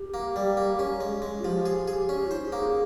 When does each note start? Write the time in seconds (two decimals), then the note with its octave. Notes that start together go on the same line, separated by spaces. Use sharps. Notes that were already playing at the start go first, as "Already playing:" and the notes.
Already playing: G4
0.14 A#3
0.36 G3
0.57 A#3
0.79 C#4
1.00 G#3
1.22 G#3
1.39 F4
1.44 F3 G4
1.66 G#4
1.88 G#4
2.09 C#4 G4
2.20 G4
2.27 F4
2.31 D#4 C5
2.42 G#4
2.52 A#3